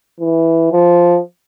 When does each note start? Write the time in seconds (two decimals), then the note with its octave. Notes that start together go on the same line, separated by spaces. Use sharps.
0.20 E3
0.72 F3